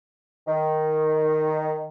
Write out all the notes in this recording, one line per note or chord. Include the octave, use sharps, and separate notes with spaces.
D#3